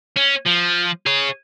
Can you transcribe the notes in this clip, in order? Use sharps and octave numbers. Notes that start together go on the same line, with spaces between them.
C#4
F3
G#4 C#5